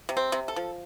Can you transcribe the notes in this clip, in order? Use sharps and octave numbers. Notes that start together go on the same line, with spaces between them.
C3
C4
C3
A4
F3